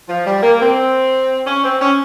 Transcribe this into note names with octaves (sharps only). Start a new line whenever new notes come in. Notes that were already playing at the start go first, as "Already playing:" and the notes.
F3
G3
A#3
C4
C#4
C4
C#4